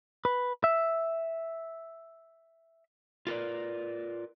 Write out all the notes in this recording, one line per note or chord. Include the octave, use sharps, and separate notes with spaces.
B4
E5
F4 A#4 B4 D5